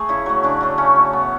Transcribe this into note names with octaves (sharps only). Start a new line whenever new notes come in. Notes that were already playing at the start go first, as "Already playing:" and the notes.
Already playing: A3 G#4
C#3 E4
F#3 A3
C#3 D4
F#3 A3
C#3 C#4
F#3 A3
A2 B3